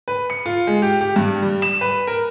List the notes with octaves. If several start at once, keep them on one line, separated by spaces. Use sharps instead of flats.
B4
C#7
F4
G#3
G4
G4
G2
G3
E7
B4
A#4